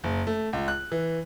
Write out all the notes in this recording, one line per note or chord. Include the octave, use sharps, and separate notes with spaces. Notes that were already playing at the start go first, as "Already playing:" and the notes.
F#1
A3
C#2
F#6
E3